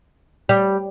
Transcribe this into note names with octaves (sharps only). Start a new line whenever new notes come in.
G3